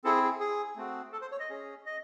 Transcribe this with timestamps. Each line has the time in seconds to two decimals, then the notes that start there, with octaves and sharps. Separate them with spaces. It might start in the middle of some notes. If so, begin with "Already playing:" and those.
0.04 C4 E4 G#4 A4
0.23 G#4
0.40 G#4
0.76 A3 C4 F#4
1.12 A4
1.21 C5
1.32 C#5
1.39 D#5
1.50 C#4 G#4
1.86 D#5